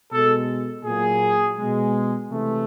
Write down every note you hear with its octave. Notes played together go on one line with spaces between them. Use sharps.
B2 G#3 A4
A#2 F#3 A#3 G#4
B2 G#3
C3 E3 A3